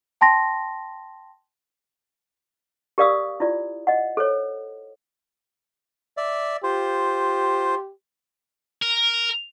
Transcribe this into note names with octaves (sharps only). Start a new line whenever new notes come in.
G5 A5 C6 A#6
G4 A#4 D5 F5 D#6 E6
E4 F4 D5
D#5 F#5
A4 C5 C#5
D5 E5
F4 G4 C5
A#4